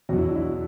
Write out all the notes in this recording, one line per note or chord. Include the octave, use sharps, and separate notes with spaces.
E2 B2 F#3 F#4
E4
D4
E4